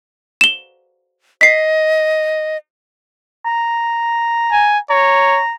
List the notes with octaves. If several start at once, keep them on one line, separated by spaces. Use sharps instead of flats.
E7 G7
D#5 B6 C7
A#5
G#5
C#5 A#5